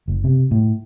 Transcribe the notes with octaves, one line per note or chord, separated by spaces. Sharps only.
F#1
C3
A2